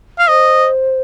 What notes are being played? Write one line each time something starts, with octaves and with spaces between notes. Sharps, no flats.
F5
C5 D#5